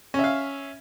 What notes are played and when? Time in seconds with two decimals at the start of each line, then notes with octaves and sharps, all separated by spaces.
0.14 C#4
0.19 E5
0.24 F5